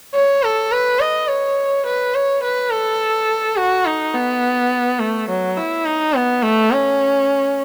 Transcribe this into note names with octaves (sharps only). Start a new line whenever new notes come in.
C#5
A4
B4
D#5
C#5
B4
C#5
B4
A4
F#4
D#4
B3
A3
F#3
E4
D#4
B3
A3
C#4